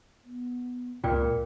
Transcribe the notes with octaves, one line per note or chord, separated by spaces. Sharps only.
B3
C#2 A#2 F4 A#4 D5 G5